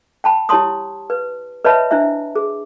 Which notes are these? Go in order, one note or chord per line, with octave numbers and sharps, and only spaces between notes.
G5 A5 B5
E4 G4 C#5 A5 C6 D#6
B4
B4 C#5 D#5 E5 A5 B5
D4 E4 C5 E5
G#4